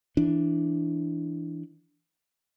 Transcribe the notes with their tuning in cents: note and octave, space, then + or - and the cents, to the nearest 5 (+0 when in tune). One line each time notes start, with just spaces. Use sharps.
E3 +0 D4 +0